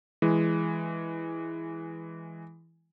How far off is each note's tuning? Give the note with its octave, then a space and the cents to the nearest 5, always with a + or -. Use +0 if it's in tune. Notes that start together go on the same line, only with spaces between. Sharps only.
E3 +0 G#3 +0